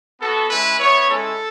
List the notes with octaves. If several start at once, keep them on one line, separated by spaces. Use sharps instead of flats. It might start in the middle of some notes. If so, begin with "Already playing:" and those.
B3 F#4 A4
G#3 C#4 E4 B4
B3 E4 C#5
G#3 C#4 E4 A4